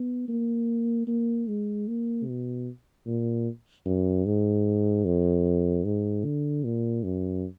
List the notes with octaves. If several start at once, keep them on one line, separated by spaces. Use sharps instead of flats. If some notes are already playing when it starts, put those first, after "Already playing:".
Already playing: B3
A#3
A#3
G#3
A#3
B2
A#2
F#2
G#2
F2
G#2
D3
A#2
F#2